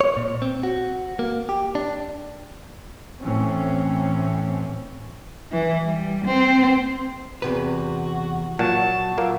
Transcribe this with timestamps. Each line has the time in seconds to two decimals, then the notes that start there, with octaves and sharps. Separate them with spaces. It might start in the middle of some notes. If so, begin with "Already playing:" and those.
0.01 C#5
0.17 A#2
0.42 C4
0.63 F#4
1.19 A#3
1.49 G4
1.75 D4
3.22 A2 E3 C4 C#4
5.52 E3
5.86 G3
6.25 C4
7.42 E2 C3 F#4 B4
8.59 A#2 F#3 F#5 A5 C#6
9.18 A#2 A#3 E5